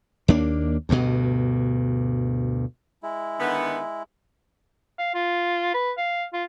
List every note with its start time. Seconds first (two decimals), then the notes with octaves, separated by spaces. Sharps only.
0.28 D#2 A#3 D4
0.89 D2 G2 B2
3.03 G#3 E4
3.40 D3 D#3 B3
4.99 F5
5.14 F4
5.74 B4
5.98 F5
6.33 F4